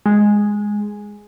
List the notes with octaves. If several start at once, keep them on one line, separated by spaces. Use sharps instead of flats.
G#3